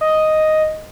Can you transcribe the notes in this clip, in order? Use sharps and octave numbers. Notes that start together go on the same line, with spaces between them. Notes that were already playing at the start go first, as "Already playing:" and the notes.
D#5